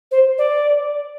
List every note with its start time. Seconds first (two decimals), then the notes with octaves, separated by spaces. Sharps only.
0.11 C5
0.38 D5